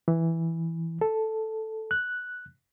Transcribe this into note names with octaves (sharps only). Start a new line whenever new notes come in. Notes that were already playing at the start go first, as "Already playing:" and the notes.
E3
A4
F#6